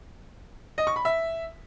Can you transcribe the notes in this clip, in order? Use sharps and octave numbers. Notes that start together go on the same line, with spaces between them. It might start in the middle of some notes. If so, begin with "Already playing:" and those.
D#5
C#6
B5
E5